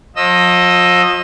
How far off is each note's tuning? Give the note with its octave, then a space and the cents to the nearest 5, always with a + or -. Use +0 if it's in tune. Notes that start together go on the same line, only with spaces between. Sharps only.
F3 +35 D#5 +0 E6 +0